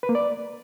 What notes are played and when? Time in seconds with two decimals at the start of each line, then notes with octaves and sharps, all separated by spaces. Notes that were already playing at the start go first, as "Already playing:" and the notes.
0.03 B4
0.09 A#3
0.15 D5